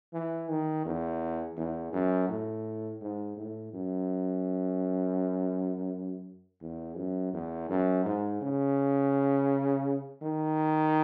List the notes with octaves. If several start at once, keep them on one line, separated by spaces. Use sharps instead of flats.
E3
D#3
E2
E2
F#2
A2
G#2
A2
F#2
E2
F#2
E2
F#2
G#2
C#3
D#3